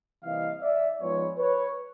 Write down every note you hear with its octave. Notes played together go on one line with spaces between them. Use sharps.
C3 E3 G3 A#3 D#5 F5
D5 E5
G#2 F3 G#3 B3 B4 C#5
B4 C#5